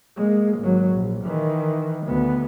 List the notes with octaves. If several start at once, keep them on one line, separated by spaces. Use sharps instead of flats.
G#3 A#3
G#1 F#3
A#1
D#3 E3
D2 B3